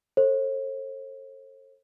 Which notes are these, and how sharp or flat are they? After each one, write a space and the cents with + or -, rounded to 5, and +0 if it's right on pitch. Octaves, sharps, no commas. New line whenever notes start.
A4 +20 C5 +45